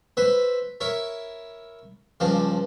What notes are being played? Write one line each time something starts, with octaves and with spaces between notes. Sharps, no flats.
B4 C5 E5
E4 A#4 C#5 E5
C#2 G2 F3 C5